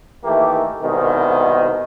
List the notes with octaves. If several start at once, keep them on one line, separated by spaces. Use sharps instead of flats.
D#3 E3 A3 A#3 G4
C2 G#2 B2 D#3